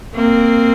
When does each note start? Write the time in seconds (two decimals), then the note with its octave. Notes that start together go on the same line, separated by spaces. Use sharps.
0.15 A#3 C4